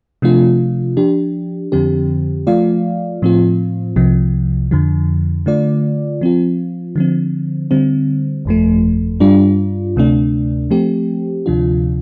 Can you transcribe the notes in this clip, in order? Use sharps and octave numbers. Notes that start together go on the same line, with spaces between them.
C3 F3 A3 D4 F4
F3 D4 G4
F2 D3 F3 C4 G4
F3 A3 F4 D5 F5
A2 F3 C4 F4
C2 C3 F3
F2 D3 F3
D3 A3 F4 D5
F3 C4 F4
D3 F3 C4
D3 G3 C4
G1 F2 F3 A3
G2 G3 D4 F4
D2 C3 A3 D4
F3 A3 C4 G4
D2 C3 F3 D4 F4